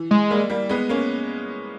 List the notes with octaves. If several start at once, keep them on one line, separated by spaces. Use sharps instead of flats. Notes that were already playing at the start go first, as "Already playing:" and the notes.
Already playing: E3
G#3
G3 A#3
G3 A#3
G#3 B3
A#3 C#4